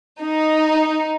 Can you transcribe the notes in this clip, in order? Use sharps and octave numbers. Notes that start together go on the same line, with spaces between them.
D#4